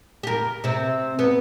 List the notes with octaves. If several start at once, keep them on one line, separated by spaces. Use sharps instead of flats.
G4 A#4
C3 C4
B3